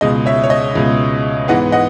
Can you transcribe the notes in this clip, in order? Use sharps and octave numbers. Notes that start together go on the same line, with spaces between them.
C#2 B2 G#3 D#5
C#5 E5
C#5
D#5
C#2 B2 G#3
G#2 E3 G#3 B3 D#5 F#5
D#5 F#5